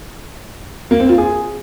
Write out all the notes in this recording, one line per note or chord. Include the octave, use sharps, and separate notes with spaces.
A#3
C4
F4
G#4